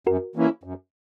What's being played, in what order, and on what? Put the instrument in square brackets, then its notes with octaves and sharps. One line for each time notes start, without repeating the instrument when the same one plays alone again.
[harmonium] F#2 [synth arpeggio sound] F#4 A#4
[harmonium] E3 A#3 C#4 E4
F#2